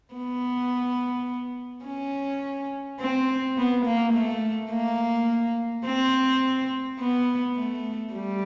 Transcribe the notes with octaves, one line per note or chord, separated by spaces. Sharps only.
B3
C#4
C4
B3
A#3
A3
A#3
C4
B3
A3
G3